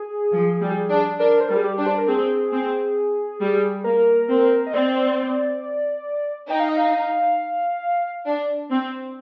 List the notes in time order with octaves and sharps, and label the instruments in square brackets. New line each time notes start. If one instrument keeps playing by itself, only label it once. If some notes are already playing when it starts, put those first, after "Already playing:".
Already playing: [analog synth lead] G#4
[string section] F3
G3
D4
[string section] D4 [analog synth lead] A#4
[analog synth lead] C5
[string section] G3 [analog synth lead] A#4
[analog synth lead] G#4
G4
[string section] D4
[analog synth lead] C5
A#4
[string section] C4 [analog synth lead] G#4
[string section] C4
G3
[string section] A#3 [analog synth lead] A#4
[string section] C4
[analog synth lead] D#5
[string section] C4 [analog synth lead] D5
[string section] D#4 [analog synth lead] G5
[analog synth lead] F5
D#5
F5
[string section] D4
C4